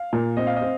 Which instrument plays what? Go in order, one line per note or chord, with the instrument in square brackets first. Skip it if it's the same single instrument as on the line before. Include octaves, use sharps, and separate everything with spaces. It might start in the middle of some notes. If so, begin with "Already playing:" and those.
Already playing: [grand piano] F5
[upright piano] A#2
[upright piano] C4 [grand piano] D#5
[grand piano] F5
D#5
[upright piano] C4